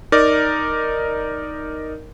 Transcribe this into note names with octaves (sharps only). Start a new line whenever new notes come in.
D#4 A#4 D5